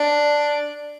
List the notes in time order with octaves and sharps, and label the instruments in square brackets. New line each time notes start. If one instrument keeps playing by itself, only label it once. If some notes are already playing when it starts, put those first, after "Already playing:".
Already playing: [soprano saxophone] D4